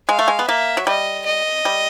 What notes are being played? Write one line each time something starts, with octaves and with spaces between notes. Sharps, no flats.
G#3 F5
A3
G#3
B3
A#3 E5
F#3
G3 D#5
D#5
G3